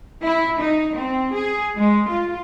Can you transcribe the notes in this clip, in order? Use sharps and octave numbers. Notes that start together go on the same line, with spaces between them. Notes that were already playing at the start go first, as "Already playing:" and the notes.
E4
D#4
C4
G#4
G#3
F4